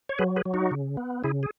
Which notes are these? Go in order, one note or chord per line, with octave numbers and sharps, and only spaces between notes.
C#5
F#3 G#4 B4
G#4 B4
F#3
D#4 F#4
C#3
B3
C#3 E4 G#4
G#4